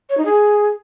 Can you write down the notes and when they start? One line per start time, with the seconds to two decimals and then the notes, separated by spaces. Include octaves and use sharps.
0.10 C#5
0.17 D#4
0.25 G#4